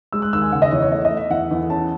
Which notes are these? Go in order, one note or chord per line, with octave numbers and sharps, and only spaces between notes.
G#3 E6
F#6
D#2 E6
G#5
C#3 F#5
D#5
E2 C#5
C#5
A3 D#5
D#5
A3
E5
E2 F#5
E2
C#4 A5